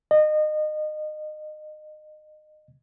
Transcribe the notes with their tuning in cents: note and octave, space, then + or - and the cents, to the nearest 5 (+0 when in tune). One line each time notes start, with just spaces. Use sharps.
D#5 -25